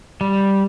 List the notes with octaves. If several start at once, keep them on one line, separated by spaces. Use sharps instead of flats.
G3